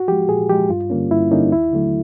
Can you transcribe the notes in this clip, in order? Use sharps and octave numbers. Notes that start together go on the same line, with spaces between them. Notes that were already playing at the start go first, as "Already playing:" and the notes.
Already playing: F#4
F3 G#3 G4
A#2 G#4
F3 G#3 G4
G2 F4
D3 G3 A#3 C#4
G2 E4
D3 G3 A#3 C#4 D#4
D#2 E4
D3 F#3 A3